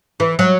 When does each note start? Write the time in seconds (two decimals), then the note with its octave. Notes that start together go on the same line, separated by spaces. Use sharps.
0.20 E3
0.39 F#3